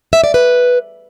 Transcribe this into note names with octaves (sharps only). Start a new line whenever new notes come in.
E5
D5
B4